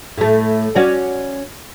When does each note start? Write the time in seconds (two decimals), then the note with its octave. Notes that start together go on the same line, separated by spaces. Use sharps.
0.17 A2 A3
0.75 C#4 F#4 D5